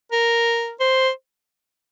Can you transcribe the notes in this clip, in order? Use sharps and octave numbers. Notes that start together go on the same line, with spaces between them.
A#4
C5